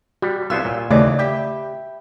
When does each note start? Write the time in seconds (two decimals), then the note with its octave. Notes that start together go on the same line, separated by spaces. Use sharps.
0.22 G3 F#4
0.50 C2 B3 F4 C5 C#5 E6
0.65 A#2
0.91 D#2 C#3 E3 A3 F4 D5 D#5
1.19 G4 E5 G5 B5